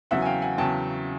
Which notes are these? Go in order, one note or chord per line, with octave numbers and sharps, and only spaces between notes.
E2 C#3 F#3 E5 F#5
G#5
F5 G5
F#5 G#5
E2 C#3 F#3 G5 A5